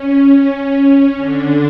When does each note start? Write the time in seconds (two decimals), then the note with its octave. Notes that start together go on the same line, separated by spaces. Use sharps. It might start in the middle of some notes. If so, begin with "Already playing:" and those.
Already playing: C#4
0.58 C#4
1.16 D3 D4